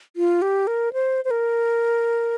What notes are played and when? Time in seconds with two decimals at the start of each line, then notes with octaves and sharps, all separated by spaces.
0.16 F4
0.42 G4
0.67 A#4
0.93 C5
1.25 C5
1.31 A#4